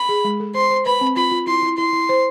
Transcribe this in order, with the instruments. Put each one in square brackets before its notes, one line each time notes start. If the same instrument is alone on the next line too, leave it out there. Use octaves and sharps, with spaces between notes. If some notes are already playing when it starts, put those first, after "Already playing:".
Already playing: [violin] B5
[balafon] G#4
G#3
A4
[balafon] C5 [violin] C6
[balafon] C5
[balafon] B4 [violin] B5
[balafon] C4
[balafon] F4 [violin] B5
[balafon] F4
[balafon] E4 [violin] C6
[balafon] E4
[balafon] E4 [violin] C6
[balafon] E4
C5